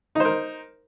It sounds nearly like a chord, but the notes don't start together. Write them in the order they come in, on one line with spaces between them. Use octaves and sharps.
D#4 C5 A#4